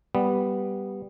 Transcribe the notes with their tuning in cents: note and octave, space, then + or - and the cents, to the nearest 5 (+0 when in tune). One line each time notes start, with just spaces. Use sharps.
G3 +0 B3 +0